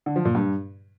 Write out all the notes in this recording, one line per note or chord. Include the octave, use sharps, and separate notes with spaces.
D3
F3
A#2
G2